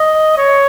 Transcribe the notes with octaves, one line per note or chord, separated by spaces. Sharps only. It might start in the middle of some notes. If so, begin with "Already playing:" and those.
Already playing: D#5
C#5